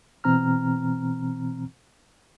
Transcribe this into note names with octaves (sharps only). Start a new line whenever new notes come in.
B2 E3 C4 A#5 F6